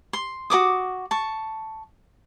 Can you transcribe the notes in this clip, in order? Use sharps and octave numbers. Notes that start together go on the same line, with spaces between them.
C6
F#4 B4 D6 D#6
A5 C#6